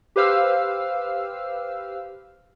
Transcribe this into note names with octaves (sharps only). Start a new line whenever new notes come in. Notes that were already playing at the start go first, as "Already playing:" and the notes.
G4 B4 C5 F5 E6 F6